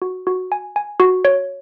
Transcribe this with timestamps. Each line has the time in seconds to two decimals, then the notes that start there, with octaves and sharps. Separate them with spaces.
0.02 F#4
0.27 F#4
0.52 G#5
0.76 G#5
1.00 F#4
1.25 C#5